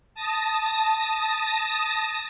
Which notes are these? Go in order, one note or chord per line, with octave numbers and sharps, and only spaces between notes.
A5 D#6 A#6